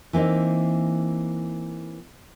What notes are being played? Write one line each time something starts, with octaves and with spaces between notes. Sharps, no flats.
E3 A#3 C4 D#4